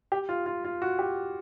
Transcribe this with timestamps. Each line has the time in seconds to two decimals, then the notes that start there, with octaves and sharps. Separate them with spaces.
0.12 G4
0.29 F4
0.46 F4
0.64 F4
0.82 F#4
0.99 G4